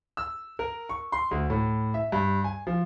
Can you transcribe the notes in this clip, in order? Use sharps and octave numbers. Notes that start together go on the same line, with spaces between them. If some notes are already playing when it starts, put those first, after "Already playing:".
E6
A#4
C#6
C6
D2
A2
E5
G2
G#5
F3